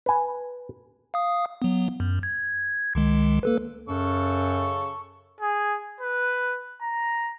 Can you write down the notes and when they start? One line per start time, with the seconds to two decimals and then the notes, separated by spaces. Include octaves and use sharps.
0.06 B4 G#5
1.14 F5 D#6
1.62 F#3 B3
2.00 F#2
2.23 G#6
2.95 C#2 D#3 G#3
3.43 A#3 A4 B4
3.89 F#2 C#3 A4 C#6
5.41 G#4
6.00 B4
6.82 A#5